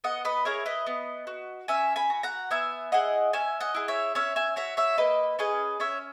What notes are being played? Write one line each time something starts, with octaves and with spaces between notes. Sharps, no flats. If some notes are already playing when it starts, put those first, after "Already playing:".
B3 D#5 F#5
B4 D#5
E4 G#4 A#4 C#5
B4 D#5
B3
F#4
C#4 E5 G#5
G#5 B5
F#4
F#5 A#5
B3 E5 G#5
E4 G#4 D#5 F#5
C#4 E5 G#5
D#5 F#5
E4 G#4
C#5 E5
C#4 C#5 E5
E5 G#5
F#4 C#5 E5
C#5 E5
A#3 B4 D#5
C#4 G#4 B4 D#5
C#4 C#5 E5